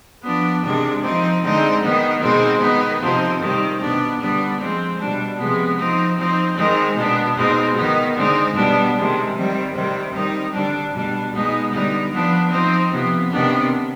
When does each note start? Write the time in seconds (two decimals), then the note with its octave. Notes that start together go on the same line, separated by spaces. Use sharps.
0.24 F3 B3 D4
0.63 C3 D#3 G#3 D4
1.04 F3 C4 D#4
1.43 D3 G#3 C4 D#4
1.82 D#3 B3 D#4
2.22 B2 G#3 C4 D#4
2.61 D#3 B3 D#4
3.01 C3 F3 C4 D#4
3.41 C3 D#3 G3 C4
3.80 B2 B3 D4
4.19 D3 G3 B3 D4
4.59 F3 G#3 C4
4.99 B2 G3 D4
5.39 C3 F3 G#3 B3
5.78 F3 C4 D#4
6.18 F3 C4 D#4
6.57 D#3 G#3 C4 D#4
6.96 B2 B3 D4
7.36 B2 G#3 C4 D#4
7.76 D#3 B3 D#4
8.16 D3 G#3 C4 D#4
8.55 B2 G3 B3 D4
8.95 C3 D#3 G#3
9.35 D#3 G3 C4
9.74 C3 D#3 G3 C4
10.13 D#3 G3 C4 D#4
10.53 D3 G3 D4
10.93 B2 G3 D4
11.33 B2 G#3 B3 D#4
11.72 D3 G3 B3 D#4
12.12 F3 B3 D4
12.51 F3 C4 D#4
12.91 C3 F3 B3
13.30 C3 D#3 B3 D4